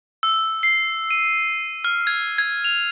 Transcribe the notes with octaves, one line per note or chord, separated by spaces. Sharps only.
E6
C7
D#7
F6
G#6
G#6
F7